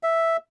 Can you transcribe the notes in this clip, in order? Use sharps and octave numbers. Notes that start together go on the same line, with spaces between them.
E5